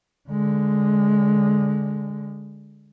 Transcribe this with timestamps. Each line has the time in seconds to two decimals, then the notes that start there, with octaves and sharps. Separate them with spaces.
0.30 D3 G#3